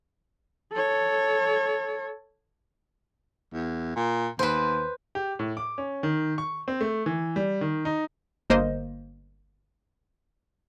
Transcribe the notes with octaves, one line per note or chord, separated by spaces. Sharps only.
A4 C#5
E2
A#2
D#2 B4 C5
G4
A2
D6
C#4
D#3
C#6
C4
A3
E3
G3
D#3
D#4
G1 A#3 C5 D#5